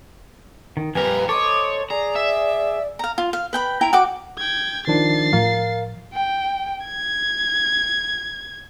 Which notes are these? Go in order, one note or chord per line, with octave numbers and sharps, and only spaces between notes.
D#3
F2 G3 G4 A#4 B4 G#5
A4 C5 C#5 D#5 D6
G#4 D5 A#5
E5
F5 A#5
F4
F5
B4 G5 B5
E4 G5 A#5
F#4 G5 D6
G5 G#6
D#3 F3 D4 A6 C7
A2 F3 A#4 F5
G5
G#6